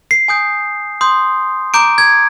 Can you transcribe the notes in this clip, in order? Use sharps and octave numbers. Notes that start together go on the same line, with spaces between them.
C7
G#5 D#6 G6
C6 D#6 G6
A#5 D6 G6 D7
G#6